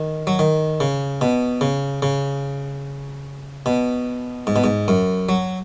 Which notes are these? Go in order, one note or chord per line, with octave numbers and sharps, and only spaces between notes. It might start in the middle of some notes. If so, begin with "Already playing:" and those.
Already playing: D#3
F#3
D#3
C#3
B2
C#3
C#3
B2
G#2
B2
G#2
F#2
F#3